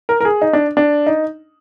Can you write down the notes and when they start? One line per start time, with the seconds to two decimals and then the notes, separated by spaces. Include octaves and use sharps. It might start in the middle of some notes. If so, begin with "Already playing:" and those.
0.09 A#4
0.21 A#4
0.25 G#4
0.42 D#4
0.53 D4
0.77 D4
1.06 D#4